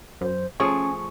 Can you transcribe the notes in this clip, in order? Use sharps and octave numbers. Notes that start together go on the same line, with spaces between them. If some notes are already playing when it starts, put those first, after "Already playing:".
F#2 C5
F3 A3 C#4 G#4 G#5 C#6